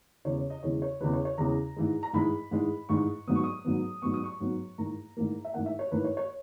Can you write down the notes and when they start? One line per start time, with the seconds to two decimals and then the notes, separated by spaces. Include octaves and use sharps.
0.25 E2 C#3 E3 G#3 C#5
0.38 C#5
0.50 D#5
0.63 E2 C#3 E3 G#3 C#5
0.82 C#5
1.00 E2 C#3 E3 G#3 B4
1.13 C#5
1.25 C#5
1.38 E2 C#3 E3 G#3 A#5
1.76 G#2 E3 G#3
2.03 A#5
2.13 G#2 E3 G#3 B5
2.51 G#2 E3 G#3
2.89 G#2 E3 G#3 C#6
3.27 G#2 F#3 B3 D#6
3.36 C#6
3.43 D#6
3.65 G#2 F#3 B3
4.02 G#2 F#3 B3 C#6
4.14 D#6
4.24 C#6
4.40 G#2 F#3 B3
4.78 G#2 E3 A#3 A#5
5.17 G#2 E3 A#3
5.45 E5
5.54 G#2 E3 A#3 F#5
5.66 E5
5.79 C#5
5.91 G#2 E3 A#3 B4
6.04 C#5
6.17 C#5